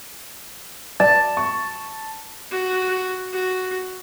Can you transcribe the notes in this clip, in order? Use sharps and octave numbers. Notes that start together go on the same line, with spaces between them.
D5 A5
C#6
F#4
F#4